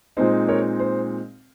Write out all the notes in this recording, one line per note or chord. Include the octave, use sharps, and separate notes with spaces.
A#2 G#3 C4 D#4 C5
A#4 C#5
C5